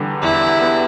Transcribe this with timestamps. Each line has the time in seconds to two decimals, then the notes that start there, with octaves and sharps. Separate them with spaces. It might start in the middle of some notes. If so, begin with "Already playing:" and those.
Already playing: E2 D3 G3 B3
0.22 E2 E4
0.62 B3